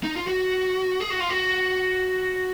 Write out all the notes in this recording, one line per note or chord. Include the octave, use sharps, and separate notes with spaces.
D#4
F4
F#4
G#4
F#4
F4
F#4